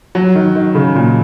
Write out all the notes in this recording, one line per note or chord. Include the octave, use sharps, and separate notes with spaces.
F#3
D#3
D#3
C#3
A#2